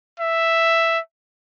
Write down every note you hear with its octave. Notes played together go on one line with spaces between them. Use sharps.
E5